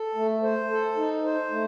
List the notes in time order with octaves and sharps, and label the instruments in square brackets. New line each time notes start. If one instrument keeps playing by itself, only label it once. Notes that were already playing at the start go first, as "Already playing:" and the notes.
Already playing: [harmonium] A4
A3
C5
A4
D#4
C5
A3